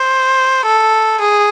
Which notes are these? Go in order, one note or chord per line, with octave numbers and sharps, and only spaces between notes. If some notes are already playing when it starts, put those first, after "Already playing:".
Already playing: C5
A4
G#4